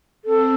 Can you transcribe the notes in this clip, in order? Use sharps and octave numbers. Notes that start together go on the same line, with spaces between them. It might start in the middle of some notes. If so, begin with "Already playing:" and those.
C4 A4